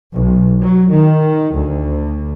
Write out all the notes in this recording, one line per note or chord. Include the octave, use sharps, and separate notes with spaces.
B1
F#3
D#3
D2